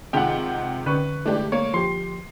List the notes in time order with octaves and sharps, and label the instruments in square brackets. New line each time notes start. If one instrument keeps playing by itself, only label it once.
[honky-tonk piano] C3 D#3 G#3 [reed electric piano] F4 G#4 [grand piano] F#5 G5
[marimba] D3 C#4 [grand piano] B4 C#6
[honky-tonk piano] E3 D4 G4 [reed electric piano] G#3 A3
[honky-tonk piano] A#3 [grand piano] C#5
[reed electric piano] F3 [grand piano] G4 C6 [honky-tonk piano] C7